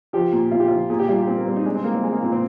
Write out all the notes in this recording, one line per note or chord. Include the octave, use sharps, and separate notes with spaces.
F3 G4
A#2
A#2 F4
G4
F3 F4
A#2 G#4
G4
G3 F4
G4
A#2 C4
A#3
G3 C4
D#4
G#3 D4
C4
G#3 A#3
C4
G#3
A#3
A#2 C4
C4